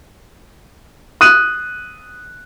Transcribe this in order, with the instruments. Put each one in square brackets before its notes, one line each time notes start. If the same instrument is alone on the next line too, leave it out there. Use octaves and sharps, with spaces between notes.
[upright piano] D#6 F#6 D#7